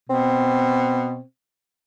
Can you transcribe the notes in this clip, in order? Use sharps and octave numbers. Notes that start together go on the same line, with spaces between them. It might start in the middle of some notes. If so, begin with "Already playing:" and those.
B2 C4